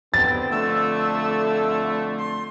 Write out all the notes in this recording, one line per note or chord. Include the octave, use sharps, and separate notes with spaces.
D3 B3 C4 A6
F2 D3 A3 E6
C6